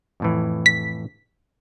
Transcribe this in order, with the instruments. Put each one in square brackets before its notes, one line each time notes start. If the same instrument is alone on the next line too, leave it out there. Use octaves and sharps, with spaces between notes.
[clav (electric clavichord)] F2 A2 E3
[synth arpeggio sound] B6